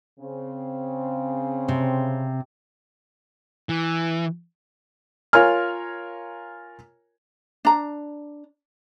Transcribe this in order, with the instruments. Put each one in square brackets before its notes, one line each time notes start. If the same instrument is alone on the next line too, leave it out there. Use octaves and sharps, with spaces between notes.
[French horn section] C#3 C4
[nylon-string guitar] C3
[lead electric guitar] E3
[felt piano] F4 A#4 C#5 G#5 F6
[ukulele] D4 A#5